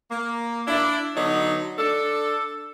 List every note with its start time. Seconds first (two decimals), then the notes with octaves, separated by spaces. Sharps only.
0.10 A#3
0.67 D4 E4
1.16 D3 F#3 B3 D#4
1.78 D4 A4